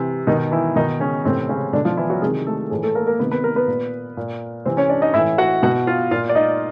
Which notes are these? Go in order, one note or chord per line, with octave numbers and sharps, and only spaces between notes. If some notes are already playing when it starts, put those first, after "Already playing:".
Already playing: C3 E3
B2 D#3 D#4
E3 E4
B2 D#3 D#4
C#3 C#4
A2 C3 E3 C4
C#3 C#4
B2 D3 D4
F3 F4
E3 E4
F#3 F#4
C3 D#3 G#3 G#4
A3 A4
A2 E3 G#3 G#4
A3 A4
A#3 A#4
A#3 A#4
C3 D#3 B3 B4
B3 B4
A#3 A#4
B3 B4
A#2
A#2
C3 E3 C4 C5
C#4 C#5
D4 D5
D#4 D#5
A2 E3 E4 E5
F#4 F#5
B2 F#4 F#5
F4 F5
A#2 F4 F5
D5
D#4 D#5